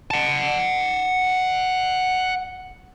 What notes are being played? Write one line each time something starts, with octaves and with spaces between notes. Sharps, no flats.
F#5 A5